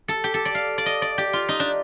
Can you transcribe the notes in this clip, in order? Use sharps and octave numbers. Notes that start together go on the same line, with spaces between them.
A4
G4
A4
D5
F5
D5
D#5
D5
G4
F4
D#4
D4